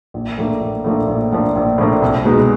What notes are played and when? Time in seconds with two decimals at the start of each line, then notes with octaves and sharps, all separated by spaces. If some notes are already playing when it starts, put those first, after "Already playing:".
0.14 A#1
0.38 A2 F3 A#3 D4
0.60 A#1
0.84 A2 F3 A#3 D4
1.07 A#1
1.32 A2 F3 A#3 D4
1.55 A#1
1.78 A2 F3 A#3 D4
2.02 C2
2.25 B2 G#3 B3 D#4